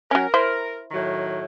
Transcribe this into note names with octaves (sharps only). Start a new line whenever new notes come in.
F#3 C#4 A#4
E4 C5
A2 D#3 F#3